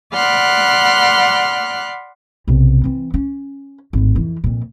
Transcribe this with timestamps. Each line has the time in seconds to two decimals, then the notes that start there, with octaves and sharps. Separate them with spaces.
0.13 D5 F#5 B5 C6 F6 F#6
2.47 B1 C3
2.84 E3 C4
3.14 C#4
3.93 G#1 A2
4.15 F2 E3
4.44 F2 A#2